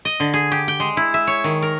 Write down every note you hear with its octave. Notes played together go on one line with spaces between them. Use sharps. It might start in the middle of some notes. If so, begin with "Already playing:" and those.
D#5
D3
G#4
G4
G5
G#3
E4
E5
C#5
D#3
A#4